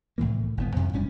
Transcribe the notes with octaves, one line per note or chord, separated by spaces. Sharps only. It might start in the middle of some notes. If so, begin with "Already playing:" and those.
C2 A2 E3 A#3
A2
G1 A2 B3
F2 C3 F#3
E1 G2 C#4 D4